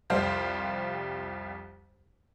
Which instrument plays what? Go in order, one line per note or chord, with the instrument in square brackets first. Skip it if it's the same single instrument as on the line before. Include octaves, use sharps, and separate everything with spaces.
[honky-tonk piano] C2 F2 G3 G4 C5 F5